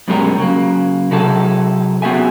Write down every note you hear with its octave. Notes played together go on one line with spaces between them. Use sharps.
F#2 B2 G3 G#3 C#4 A#4
C#3 F#3 A#3
C3 F#3 E4 G#4 A4
B3 C4 F#4 G#4 E5 G#5